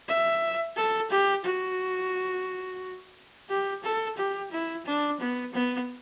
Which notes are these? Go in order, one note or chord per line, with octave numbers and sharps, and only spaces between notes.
E5
A4
G4
F#4
G4
A4
G4
E4
D4
B3
B3